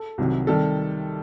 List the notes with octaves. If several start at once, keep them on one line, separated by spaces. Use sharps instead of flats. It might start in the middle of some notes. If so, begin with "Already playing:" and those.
Already playing: A4
C2 C3 D#3 F#3
C3 D#3 G3 A4